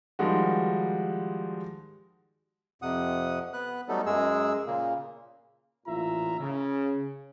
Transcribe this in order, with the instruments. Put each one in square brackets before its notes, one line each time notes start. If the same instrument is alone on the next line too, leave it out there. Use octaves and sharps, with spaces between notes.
[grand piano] D#3 F3 G3 G#3 F#4
[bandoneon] F2 C3 F#5 D#6
B3 B4 F#6
F#3 G3 A3 B3 D#4 A4
F#2 G#3 G#4 E6
A#2 C#3 A#3
[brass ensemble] A1 A#2 E4 F4 E5 A#5
C#3